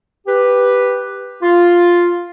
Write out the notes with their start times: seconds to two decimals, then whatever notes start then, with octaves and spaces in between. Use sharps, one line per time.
0.27 G4 B4
1.42 F4